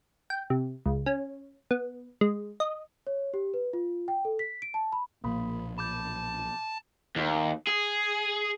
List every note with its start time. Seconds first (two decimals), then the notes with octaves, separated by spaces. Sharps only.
0.30 G5
0.50 C3
0.86 C#2
1.06 C#4
1.71 B3
2.21 G#3
2.60 D#5
3.07 C#5
3.34 G4
3.54 B4
3.73 F4
4.08 G5
4.25 A4
4.39 B6
4.62 D7
4.74 A5
4.92 B5
5.24 B1 A#2 F3 A#3 B5
5.78 A5 B5 D6 G6
7.16 D#2
7.67 G#4